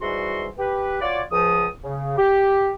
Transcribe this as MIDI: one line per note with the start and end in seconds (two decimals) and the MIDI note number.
0.02 0.47 44
0.02 0.47 52
0.02 0.47 55
0.02 0.47 66
0.02 0.47 84
0.58 1.00 67
0.58 1.00 71
1.02 1.21 65
1.02 1.21 66
1.02 1.21 73
1.02 1.21 74
1.31 1.66 37
1.31 1.66 53
1.31 1.66 87
1.84 2.14 49
2.18 2.72 67